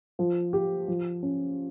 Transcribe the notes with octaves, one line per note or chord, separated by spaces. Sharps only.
F3
G4
F3
C#4